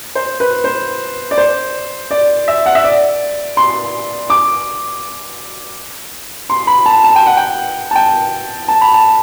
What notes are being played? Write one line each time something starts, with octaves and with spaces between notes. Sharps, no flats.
C5
B4
C5
D5
C5
D5
E5
F#5
E5
D5
C6
D6
C6
B5
A5
A5
G5
F#5
G5
A5
G5
A5
B5
A5